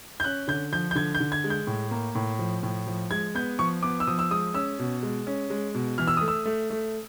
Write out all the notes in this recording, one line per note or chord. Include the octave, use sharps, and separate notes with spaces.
G6
C#4 F#6
D3 G6
F3 G6
G6
D3 G#6
G6
D3
G#6
G#3
G6
A2
A#3
A2
F3
A2
F3
G#3 G#6
B3 G6
F3 C#6
B3 D6
E6
F3 D#6
E6
G#3 D#6
C#4 E6
B2
G#3
C#4
G#3
B2
E3 F6
E6
A3 D#6
E6
A3
A3